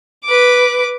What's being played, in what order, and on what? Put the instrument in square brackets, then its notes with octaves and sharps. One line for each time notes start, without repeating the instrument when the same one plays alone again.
[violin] B4 D6